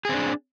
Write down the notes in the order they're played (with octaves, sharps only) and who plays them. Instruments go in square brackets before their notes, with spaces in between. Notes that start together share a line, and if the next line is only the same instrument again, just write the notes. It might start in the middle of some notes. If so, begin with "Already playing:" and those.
[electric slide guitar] G#4
C4
D4